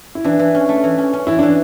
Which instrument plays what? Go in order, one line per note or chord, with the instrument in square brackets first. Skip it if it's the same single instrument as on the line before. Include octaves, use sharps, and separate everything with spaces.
[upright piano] E4
[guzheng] E3 [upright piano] D4
[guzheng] E3
C#4
A3
E3
C#4
C#4
[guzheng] E3 [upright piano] E4
[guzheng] E3 [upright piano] D4